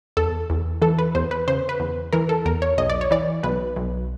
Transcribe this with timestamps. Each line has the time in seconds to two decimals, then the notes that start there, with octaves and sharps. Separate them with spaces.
0.17 E2 A4
0.50 E2
0.82 E3 A4
0.99 B4
1.15 E2 C5
1.31 B4
1.48 C#3 C5
1.69 B4
1.80 E2
2.13 E3 A#4
2.29 A4
2.45 E2 A#4
2.62 C#5
2.78 B1 D#5
2.90 D5
3.01 C#5
3.11 E3 D5
3.43 B1 B4
3.76 B1